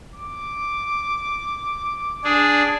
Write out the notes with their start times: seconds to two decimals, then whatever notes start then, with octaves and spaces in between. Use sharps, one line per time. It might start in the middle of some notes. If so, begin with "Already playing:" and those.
0.15 D6
2.24 D4 G#4